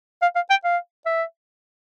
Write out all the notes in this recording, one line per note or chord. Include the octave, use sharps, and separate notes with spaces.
F5
F5
G5
F5
E5